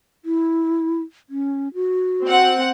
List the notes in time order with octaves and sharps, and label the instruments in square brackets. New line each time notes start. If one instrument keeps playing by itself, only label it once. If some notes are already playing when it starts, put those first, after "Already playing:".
[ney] E4
C#4
F#4
[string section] C4 F#5